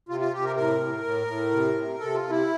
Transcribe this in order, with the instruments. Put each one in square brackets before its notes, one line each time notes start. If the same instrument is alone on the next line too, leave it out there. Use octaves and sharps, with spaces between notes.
[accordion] C3 F4
F4
C3 G4
A#4
A2 A#4
A2
A2
A2
C3
C3
C3 A4
F4
C3
E4